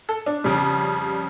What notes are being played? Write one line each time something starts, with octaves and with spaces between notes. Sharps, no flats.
A4
D4
F2 C#3 G3